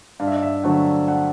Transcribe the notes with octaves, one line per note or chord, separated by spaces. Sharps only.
G2 F5
E5
D#5
E5
D3 F#3 A3 C4 F#5
F#5